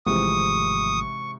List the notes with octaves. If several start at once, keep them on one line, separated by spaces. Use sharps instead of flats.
G#1 G#2 C3 E3 F3 A3 C#6 D#6